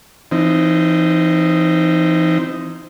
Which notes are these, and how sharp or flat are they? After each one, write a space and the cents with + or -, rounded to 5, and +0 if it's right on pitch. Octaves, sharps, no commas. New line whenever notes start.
E3 +35 C4 +0 D#4 +0